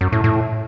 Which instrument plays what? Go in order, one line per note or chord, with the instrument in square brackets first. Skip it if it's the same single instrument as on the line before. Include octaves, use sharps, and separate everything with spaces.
[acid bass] F#2
A2
A2